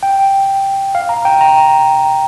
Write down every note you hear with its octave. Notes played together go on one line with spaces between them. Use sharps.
G5
F5
A#5
G5
A#5